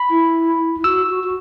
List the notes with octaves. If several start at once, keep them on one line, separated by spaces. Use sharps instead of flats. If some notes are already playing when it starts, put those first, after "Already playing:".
Already playing: B5
E4
E4
F#4 E6
F#4
F#4